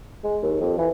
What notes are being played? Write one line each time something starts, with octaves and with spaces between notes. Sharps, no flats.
G#3
D#2
F2
E3